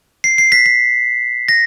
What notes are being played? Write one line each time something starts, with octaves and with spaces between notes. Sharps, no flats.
C7
C7
B6
B6
A#6